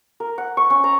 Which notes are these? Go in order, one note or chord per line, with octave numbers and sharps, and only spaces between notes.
A#4
F#5
C#6
C#4
A#5